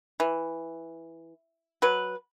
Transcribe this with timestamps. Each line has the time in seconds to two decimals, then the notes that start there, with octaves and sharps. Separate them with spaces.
0.20 E3
1.82 F#3 B4